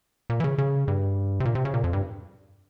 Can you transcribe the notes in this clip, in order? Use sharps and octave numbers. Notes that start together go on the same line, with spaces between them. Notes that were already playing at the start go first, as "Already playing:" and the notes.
A#2
E3
C#3
C#3
G2
C3
A#2
C3
C#3
A#2
F2
G2